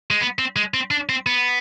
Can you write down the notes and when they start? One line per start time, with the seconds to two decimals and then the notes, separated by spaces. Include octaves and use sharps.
0.11 G#3
0.21 B3
0.39 C4
0.56 G#3
0.74 C4
0.91 D4
1.09 C4
1.26 B3